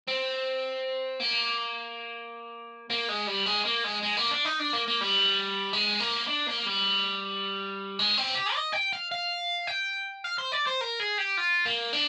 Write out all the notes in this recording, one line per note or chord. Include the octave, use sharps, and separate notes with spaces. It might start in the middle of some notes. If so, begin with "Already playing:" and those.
C4
A#3
A#3
G#3
G3
G#3
A#3
G#3
G#3
A#3
D4
D#4
D4
A#3
A#3
G3
G#3
A#3
D4
A#3
G3
G#3
C4
G4
D#5
G5
F5
F5
G5
F5
C5
D5
C5
A#4
G#4
G4
F4
A#3
D4